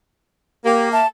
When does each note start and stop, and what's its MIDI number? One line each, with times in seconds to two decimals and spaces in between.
0.65 1.01 58
0.65 0.90 67
0.91 1.06 76
0.91 1.06 81